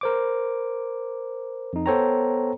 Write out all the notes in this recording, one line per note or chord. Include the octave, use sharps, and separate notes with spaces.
A#4 C5 D6
F2 D#4
B3 A4 C5 C#5 G5 A#5